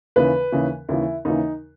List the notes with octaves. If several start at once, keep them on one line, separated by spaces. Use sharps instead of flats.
D#2 C#3 E3 B4
D#2 C#3 E3
D#2 C#3 E3 E4
D#2 C#3 E3 D#4